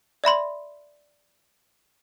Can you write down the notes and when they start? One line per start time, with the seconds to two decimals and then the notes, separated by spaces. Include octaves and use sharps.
0.24 D5 E5 B5 C6